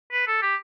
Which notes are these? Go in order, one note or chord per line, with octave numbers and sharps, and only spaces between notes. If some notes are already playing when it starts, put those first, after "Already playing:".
B4
A4
G4